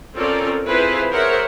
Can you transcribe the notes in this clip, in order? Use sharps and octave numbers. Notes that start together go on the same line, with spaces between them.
C4 C#4 F4 A4 A#4 D5
C4 E4 F4 G#4 B4 C5
G#4 A#4 C5 C#5 E5 F#5